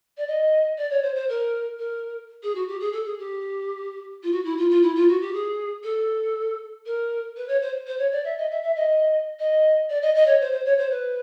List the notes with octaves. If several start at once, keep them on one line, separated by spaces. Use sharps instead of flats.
D5
D#5
D5
C#5
C5
C5
A#4
A#4
G#4
F#4
G4
G#4
A4
G#4
G4
F4
F#4
E4
F4
F4
E4
F4
F#4
G4
G#4
A4
A#4
B4
C#5
C5
C5
C#5
D5
E5
D#5
E5
E5
D#5
D#5
D5
D#5
D#5
C#5
C5
C5
C#5
C5
B4